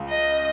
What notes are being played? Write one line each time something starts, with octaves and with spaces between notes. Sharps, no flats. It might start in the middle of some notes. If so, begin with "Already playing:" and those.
Already playing: C#2 C#3
D#5